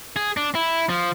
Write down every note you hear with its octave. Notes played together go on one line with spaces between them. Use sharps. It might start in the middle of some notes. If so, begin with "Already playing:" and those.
G#4
D4
E4
F3